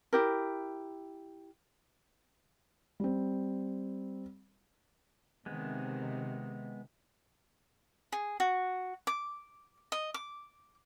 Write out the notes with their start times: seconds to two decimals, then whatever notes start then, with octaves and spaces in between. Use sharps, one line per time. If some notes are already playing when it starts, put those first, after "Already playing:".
0.13 E4 G4 A#4
3.00 G3 C4
5.46 C3 D#3 G#3 B3
8.12 G#4
8.40 F#4
9.07 D6
9.92 D#5
10.14 D6